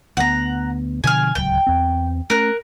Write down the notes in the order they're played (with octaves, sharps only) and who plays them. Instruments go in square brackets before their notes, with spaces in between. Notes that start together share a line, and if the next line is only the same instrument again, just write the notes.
[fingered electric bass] D2 A3 B3 [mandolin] F#5 A#5
[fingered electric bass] B2 D3 F3 [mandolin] G#5 F6
[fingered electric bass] D1 C#2 F#3 [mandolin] G5
[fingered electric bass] E2 C4
[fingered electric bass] A3 C#4 [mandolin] A#4 F#6